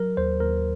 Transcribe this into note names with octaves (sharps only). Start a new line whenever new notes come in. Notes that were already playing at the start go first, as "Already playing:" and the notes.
Already playing: F#3 A#4
D#2 C5
D#2 A#4